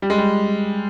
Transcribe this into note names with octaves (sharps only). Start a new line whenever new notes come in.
G3
G#3
G3